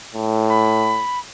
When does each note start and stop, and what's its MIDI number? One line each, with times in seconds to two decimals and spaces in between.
0.14 1.02 45
0.49 1.19 83